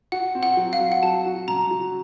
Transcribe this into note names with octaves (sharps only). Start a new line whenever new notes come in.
F#4 F#5
C4
F#5
F#3
F5
F#3
F#5
F#3 A5
F#4
C#3 A#5
F#3